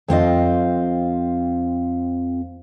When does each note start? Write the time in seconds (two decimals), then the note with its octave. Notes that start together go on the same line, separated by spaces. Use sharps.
0.08 F2 C4 F4 D#5